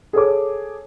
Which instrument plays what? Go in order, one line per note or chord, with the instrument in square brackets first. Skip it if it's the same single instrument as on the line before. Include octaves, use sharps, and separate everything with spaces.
[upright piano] G#4 A4 C#5 D6